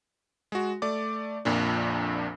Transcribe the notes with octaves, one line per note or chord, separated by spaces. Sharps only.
G#3 F#4
A3 D5 D6
A#1 F2 A#2 D4